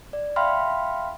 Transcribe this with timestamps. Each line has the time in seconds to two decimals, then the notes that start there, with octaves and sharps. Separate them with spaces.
0.13 D5
0.36 E5 F5 G5 B5 C6 F6